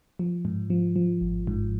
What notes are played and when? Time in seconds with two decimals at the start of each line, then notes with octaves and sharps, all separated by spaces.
0.19 F3
0.45 G#2
0.70 F3
0.96 F3
1.21 G#1
1.47 G#2